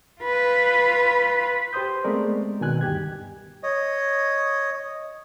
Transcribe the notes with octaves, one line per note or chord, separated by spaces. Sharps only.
F4 B4
G4 C5 C6 D#6 G6
G#3 A3 B3 C4 A#4 D5
B2 D#3 G#5 F#6
D2 G2 G4 G#6
C#5 D#5